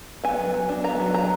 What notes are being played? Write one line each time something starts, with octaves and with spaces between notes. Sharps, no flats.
B3 G#5
F#3
F#3
D4
B3 A#5
F#3
F#3 A#5